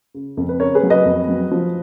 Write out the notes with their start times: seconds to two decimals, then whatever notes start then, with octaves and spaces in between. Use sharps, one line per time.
0.14 C#3
0.37 F2
0.49 B4
0.60 C#3 A#4 C#5
0.75 G#4 B4
0.83 F#3
0.90 B4 D#5
1.05 F2
1.28 F#3
1.51 F3